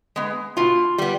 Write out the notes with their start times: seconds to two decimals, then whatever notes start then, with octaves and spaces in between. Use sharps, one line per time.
0.16 G#3 B3
0.57 B2 F4
0.98 G3 B3